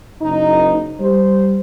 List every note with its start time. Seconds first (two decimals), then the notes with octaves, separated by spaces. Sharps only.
0.22 F#1 D#4
1.00 G3 C5